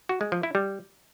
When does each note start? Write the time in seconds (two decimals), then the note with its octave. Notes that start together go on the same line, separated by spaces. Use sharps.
0.09 F#4
0.21 G#3
0.32 F3
0.43 E4
0.55 G3